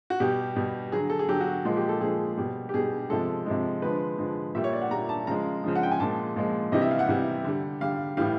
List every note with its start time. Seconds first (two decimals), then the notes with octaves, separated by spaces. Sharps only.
0.10 F#4
0.20 B2 G3 G4
0.56 B2 G3
0.92 D3 F#3 G#4
1.10 A4
1.19 G#4
1.29 D3 F#3 G4
1.41 F#4
1.65 A#2 F3 G#3
1.77 G4
1.89 A4
2.01 A#2 F3 G#3 G#4
2.38 B2 G3
2.69 G4
2.74 B2 G3 G#4
3.10 C3 F3 G#3 A4
3.46 C3 F3 G#3
3.82 D3 F3 G#3 B4
4.18 D3 F3 G#3
4.55 A#2 G3 E5
4.64 C#5
4.73 D5
4.82 F#5
4.91 A#2 G3 A#5
5.09 A5
5.27 C#3 F3 G#3 A#5
5.64 C#3 F3 G#3
5.76 F#5
5.83 G5
5.91 G#5
6.00 A#2 F3 G#3 A5
6.36 A#2 F3 G#3
6.72 C3 E3 G3 D#5
6.81 E5
6.91 F5
6.99 F#5
7.09 C3 E3 G3
7.45 D3 G3
7.81 D3 G3 F5
8.17 A2 E3 G3 F5